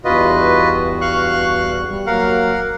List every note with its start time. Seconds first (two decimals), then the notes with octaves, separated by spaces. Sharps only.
0.05 E2 G2 F4 F#4 B4 D#5
1.01 F5 C#6 F#6
1.90 G3
2.07 F#3 A#3 A#4 F5 F#5